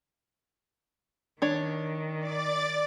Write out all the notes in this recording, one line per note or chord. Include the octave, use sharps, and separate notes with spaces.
D#3 D4 C#5
D5 D6 A6